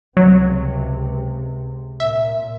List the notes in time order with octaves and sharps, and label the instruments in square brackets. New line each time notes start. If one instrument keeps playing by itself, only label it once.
[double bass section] C#2 C3 [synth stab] F#3
[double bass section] A#2 [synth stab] E5